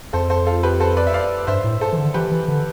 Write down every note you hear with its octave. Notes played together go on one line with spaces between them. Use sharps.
F2 A4 C5
A4 C5
F4 A4
G4 B4
A4 C5
B4 D5
E5
D5 F5
G2 C5 E5
A2
A4 C5
E3
D3
E3 G4 B4
E3
D3